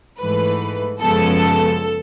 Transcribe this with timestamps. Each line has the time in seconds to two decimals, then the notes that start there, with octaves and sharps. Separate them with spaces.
0.20 G#2 E3 A3 B4
1.00 F#2 C#3 F3 G#3 B3 A4